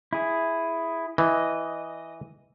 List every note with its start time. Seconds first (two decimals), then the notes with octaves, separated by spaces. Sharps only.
0.13 E4 G#4
1.18 E3 D#5